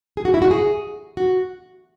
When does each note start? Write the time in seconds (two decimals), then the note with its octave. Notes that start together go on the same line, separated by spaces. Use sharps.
0.17 G#4
0.25 F#4
0.34 E4
0.42 F#4
0.51 G#4
1.17 F#4